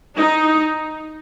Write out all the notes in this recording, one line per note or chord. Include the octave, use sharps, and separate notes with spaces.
D#4